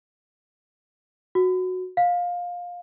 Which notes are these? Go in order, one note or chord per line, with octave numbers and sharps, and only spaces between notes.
F#4
F5